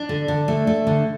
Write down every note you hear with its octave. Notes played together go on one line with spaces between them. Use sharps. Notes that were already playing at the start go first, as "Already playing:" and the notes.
Already playing: D4
D3
D3
A3
A3
D3